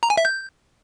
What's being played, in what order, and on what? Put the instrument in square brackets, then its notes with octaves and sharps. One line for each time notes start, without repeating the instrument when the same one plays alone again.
[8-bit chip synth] A#5
G#5
E5
G6